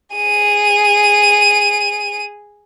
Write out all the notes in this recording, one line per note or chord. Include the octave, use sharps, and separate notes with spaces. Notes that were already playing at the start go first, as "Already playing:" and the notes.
G#4 D#7